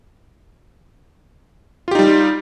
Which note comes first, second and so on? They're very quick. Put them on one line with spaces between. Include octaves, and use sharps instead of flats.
F4 G4 D#4 G3